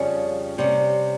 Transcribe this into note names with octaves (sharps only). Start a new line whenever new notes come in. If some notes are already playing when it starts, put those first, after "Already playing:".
Already playing: F2 C#3 G3 C#4
C3 G3 C#4